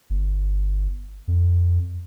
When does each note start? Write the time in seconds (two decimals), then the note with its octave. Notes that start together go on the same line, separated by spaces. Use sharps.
0.10 G1
1.28 F2